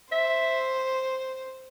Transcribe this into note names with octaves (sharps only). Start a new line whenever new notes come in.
C5 E5